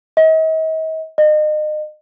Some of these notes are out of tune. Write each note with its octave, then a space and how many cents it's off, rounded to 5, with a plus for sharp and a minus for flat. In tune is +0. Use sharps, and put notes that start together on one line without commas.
D#5 +40
D#5 -35